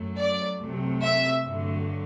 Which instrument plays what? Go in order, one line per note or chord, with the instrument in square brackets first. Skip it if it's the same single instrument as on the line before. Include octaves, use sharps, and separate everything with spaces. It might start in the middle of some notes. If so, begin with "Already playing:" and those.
Already playing: [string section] F#2 F#3 A3
D5
C2 C3 F#3 A3
E5
G2 D3 F#3 A3